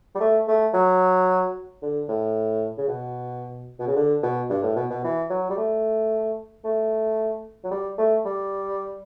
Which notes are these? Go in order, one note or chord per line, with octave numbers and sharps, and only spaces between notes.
G3
A3
A3
F#3
D3
A2
C#3
B2
B2
C#3
D3
B2
G2
A2
B2
B2
E3
F#3
G3
A3
A3
F#3
G3
A3
G3